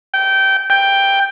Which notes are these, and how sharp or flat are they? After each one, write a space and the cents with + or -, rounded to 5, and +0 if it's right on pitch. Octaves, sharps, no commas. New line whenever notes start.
G5 -20
G5 +5